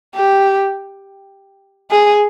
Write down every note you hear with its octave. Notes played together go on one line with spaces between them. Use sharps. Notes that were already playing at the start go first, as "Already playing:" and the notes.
G4
G#4